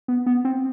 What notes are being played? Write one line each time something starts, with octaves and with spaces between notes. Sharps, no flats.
B3
B3
C4